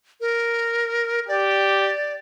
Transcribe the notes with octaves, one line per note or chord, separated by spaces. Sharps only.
A#4
G4 D5